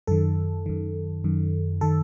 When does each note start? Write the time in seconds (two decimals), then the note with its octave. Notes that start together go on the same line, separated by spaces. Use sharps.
0.07 F#2 D#3 A4
0.66 F#2 D#3
1.24 F#2 D#3
1.81 D#3 A4